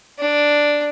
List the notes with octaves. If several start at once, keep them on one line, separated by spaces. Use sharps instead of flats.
D4